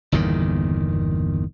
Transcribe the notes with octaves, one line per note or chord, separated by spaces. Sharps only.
G1 E2 A#2 D#3